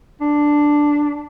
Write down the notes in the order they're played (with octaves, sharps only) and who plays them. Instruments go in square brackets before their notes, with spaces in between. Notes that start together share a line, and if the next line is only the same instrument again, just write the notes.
[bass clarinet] D4